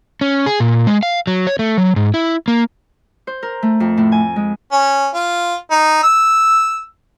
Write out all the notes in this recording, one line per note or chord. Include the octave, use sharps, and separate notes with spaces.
C#4
G#4
A#2
G#3
F5
F#3
C#5
A3
F#3
G#2
E4
A#3
C5
A#4
A3
F2
A2
G#5
G#3
C#4
F4
D#4
E6